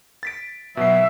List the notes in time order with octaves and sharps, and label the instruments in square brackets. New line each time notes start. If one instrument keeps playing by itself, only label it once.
[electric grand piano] A6 B6 D7
[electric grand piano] B2 F#3 C7 [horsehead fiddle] E5